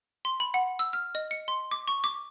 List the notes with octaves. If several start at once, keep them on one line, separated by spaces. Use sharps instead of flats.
C6
B5
F#5
E6
F6
D#5
C#7
C6
D6
C#6
D6